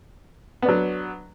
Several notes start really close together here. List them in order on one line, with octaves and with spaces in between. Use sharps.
B3 D4 F#3